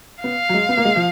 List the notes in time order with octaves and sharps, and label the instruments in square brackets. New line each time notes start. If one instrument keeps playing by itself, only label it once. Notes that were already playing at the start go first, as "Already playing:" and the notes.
[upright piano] B3 [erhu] F5
[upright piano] F#3
G#3
B3
A#3
G#3
F3